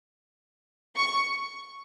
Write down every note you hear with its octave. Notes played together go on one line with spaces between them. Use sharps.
C#6